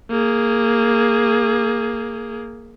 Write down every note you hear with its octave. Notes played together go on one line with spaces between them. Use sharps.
A#3 G#4